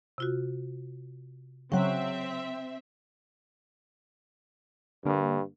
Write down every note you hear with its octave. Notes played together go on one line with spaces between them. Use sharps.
C3 F4 F#4
C#3 F#3 C4 E5 G5
G2 D3 A#3